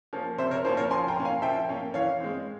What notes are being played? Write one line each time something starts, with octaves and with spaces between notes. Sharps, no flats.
F3 A#3 C#4
C3 C5 E5
A#4 C#5
F3 A#3 C#4 C5
A#4 C#5
F3 G#5 C6
G5 A#5
A#3 C#4
F5 G#5
F3 E5 G5
A#3 C#4
E3 C#5 F5
G#3 C4